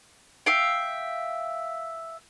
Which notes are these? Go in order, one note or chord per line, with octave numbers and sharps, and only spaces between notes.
E5 F5 G5